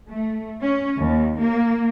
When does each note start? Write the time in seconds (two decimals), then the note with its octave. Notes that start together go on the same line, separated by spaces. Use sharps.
0.10 A3
0.63 C#4
1.03 D#2
1.41 A#3